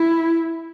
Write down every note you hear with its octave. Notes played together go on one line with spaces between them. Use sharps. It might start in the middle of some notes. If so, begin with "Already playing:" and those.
Already playing: E4